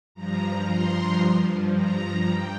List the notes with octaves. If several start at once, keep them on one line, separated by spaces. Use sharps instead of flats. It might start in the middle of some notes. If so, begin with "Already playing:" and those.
G2 F3 A#5
C6
G2 F3
A#5
G2 G5